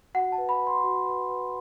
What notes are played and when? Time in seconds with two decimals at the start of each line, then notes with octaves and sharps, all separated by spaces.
0.14 F#4 F#5
0.32 A5
0.38 B4
0.49 B5
0.61 B4
0.67 C6
0.84 F#4
1.07 B4
1.30 B4